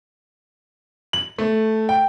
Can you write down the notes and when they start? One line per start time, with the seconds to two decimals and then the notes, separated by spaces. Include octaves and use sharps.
1.13 F#7
1.38 A3
1.89 G5